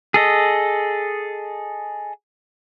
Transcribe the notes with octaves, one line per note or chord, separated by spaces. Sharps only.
G#4 A4 D#5